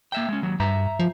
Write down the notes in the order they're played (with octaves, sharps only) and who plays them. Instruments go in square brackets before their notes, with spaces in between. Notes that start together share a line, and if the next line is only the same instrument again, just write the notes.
[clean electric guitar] A#3 E5 G5
G#3 C#4
D#2 F#3
[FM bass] G2 [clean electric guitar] E5 A#5
[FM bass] F3